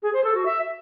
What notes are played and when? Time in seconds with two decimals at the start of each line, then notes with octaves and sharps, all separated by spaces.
0.03 G#4
0.13 C5
0.24 A4
0.35 F#4
0.46 E5